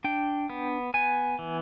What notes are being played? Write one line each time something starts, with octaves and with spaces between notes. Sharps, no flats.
D4 G5
B3
B3 G#5
E3